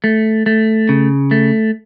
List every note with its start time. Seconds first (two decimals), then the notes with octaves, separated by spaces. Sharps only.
0.04 A3
0.46 A3
0.89 C#3
1.31 A3